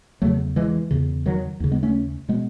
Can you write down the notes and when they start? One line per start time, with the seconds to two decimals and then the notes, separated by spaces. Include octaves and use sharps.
0.22 E2 C#3 F#3 A3
0.56 E3 G#3
0.91 E2 C#3
1.26 D#3 F#3
1.60 D#2 C#3
1.71 G#3 B3
1.83 A3 C#4
2.29 B2 G#3 B3